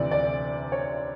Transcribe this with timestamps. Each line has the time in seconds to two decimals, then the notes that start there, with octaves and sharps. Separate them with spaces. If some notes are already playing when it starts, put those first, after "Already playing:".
Already playing: D2 C3 E3 D5
0.11 D5
0.72 C#5